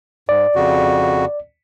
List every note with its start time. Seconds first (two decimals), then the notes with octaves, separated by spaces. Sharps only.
0.29 G#2 D5
0.55 F2 C#3 F#4